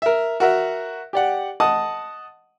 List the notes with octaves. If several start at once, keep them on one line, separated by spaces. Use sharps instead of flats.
A#4 E5
F#4 A#4 E5
G4 D5 F#5
D#5 F#5 A5 D#6